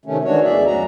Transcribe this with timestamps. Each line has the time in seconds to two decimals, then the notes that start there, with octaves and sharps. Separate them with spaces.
0.05 C3 D#3 A3 C#4
0.24 D#3 E3 G#3 D4 F#4 C#5
0.44 D2 B2 G#4 D5 E5
0.66 F#2 G#3 C#4 F#4 A#5